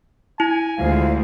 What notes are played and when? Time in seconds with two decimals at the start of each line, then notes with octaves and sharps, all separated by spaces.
0.40 E4 G#5
0.78 D2 G#3 F4 C5 F5